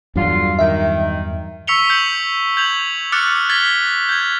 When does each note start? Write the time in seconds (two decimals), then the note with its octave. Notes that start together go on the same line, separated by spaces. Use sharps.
0.16 E2 G2 D3 F#3 F4
0.59 D#3 E5 G5
1.67 C#6 E6 B6 C#7 F7 G7
1.89 E6 G6 C#7 F#7
2.57 G6 G#6 F7 F#7
3.12 D6 F6 F#6 A6 C#7
3.49 F6 F#6 G#6 A6 B6 G7
4.09 G6 G#6